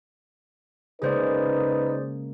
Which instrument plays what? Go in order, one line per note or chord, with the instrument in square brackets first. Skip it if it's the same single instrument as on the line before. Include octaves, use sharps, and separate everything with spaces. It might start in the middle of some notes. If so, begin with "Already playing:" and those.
[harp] C#3 G#3 A#3 [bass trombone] D#4 [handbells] G#4 C5 D5 [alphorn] B4